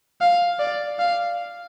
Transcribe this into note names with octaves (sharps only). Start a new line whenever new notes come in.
F5
D5
F5